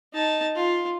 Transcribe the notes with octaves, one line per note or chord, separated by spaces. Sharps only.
D#4 A5
F4